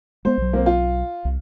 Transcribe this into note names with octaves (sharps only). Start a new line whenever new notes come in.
G#3 B3 C5
B1 F#3
A#3 C4
F4
C2